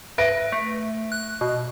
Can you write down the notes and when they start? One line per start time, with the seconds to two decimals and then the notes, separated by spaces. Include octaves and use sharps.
0.18 B4 E5 A#6 D7
0.52 A3
1.12 F#6
1.41 B2